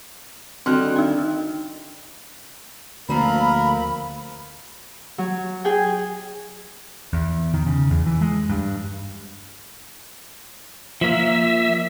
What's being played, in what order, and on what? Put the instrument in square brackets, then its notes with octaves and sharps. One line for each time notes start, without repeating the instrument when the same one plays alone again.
[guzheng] D3 D#3 G3 [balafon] C4 F#4 [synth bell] C6 F6 F#6
[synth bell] D#4 G5
[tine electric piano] D2 [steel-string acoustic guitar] F3 A#3 C4 [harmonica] A#4 [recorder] B5
[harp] F#3
G#4 G5 G#5
[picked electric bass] E2
D#3
C#3
E2
E3
G#3
G2
[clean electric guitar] F3 A#3 [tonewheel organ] E5